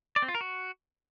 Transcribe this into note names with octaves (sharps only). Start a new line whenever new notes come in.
D5
C4
F4
A#4
F#4